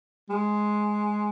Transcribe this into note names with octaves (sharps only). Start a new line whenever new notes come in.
G#3